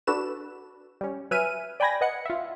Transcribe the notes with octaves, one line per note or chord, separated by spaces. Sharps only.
D4 F#4 A4 B4 E7
G3 C#4
F#3 B4 E5 G#5 F6 D#7
D5 G5 G#5 B5 G#6 A#6
B4 D#5 F#5 C#7
F4 E5